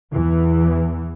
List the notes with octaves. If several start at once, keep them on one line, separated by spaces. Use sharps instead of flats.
E2 E3